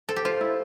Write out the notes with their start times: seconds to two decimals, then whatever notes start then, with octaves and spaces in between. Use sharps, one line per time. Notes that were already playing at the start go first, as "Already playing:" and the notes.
0.09 A4 C5
0.16 G4
0.25 F4 C5
0.41 E4